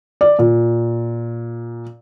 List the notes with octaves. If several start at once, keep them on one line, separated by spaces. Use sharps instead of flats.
D5
A#2